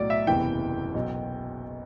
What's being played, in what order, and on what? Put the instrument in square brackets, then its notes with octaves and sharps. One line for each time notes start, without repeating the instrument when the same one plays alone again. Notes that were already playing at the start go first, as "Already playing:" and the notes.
Already playing: [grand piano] B1 A2 F#3 D5
E5
F#1 E2 C3 E3 G5
B1 B2 F#3